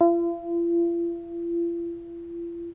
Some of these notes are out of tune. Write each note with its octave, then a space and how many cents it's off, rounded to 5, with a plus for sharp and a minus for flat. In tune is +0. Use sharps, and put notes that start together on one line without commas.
F4 -45